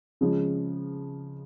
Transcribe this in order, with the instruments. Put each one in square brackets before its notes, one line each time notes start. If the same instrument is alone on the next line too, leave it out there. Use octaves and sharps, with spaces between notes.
[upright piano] C#3 F3 G#3